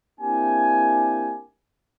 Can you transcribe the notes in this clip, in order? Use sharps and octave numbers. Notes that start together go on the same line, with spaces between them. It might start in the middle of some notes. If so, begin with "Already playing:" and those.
A#3 C4 D4 E4 G4 G#5